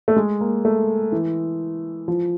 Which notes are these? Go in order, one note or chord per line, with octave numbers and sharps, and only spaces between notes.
A3
G#3
A#3
A3
E3
F3